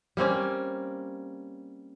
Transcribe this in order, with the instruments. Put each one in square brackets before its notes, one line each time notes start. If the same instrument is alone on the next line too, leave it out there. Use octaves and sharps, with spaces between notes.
[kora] G3 A#3 C4 C#4